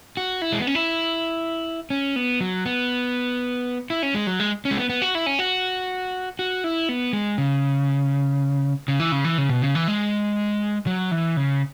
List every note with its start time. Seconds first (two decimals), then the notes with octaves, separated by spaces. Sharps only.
0.17 F#4
0.42 E4
0.52 G#3
0.60 B3
0.67 C#4
0.75 E4
1.90 C#4
2.16 B3
2.40 F#3
2.65 B3
3.90 E4
4.03 C#4
4.15 G#3
4.27 F#3
4.40 G#3
4.65 C#4
4.71 G#3
4.77 B3
4.89 B3
5.02 F#4
5.15 E4
5.26 C#4
5.39 F#4
6.39 F#4
6.64 E4
6.89 B3
7.13 G#3
7.38 C#3
8.88 C#3
9.00 E3
9.12 C#3
9.24 E3
9.38 C#3
9.49 B2
9.62 C#3
9.75 E3
9.88 G#3
10.87 F#3
11.11 E3
11.37 C#3